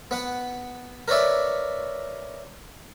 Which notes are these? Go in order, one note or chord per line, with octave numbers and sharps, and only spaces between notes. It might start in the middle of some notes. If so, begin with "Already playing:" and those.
B3 B4 F#5
A#4 B4 C#5 D5 E5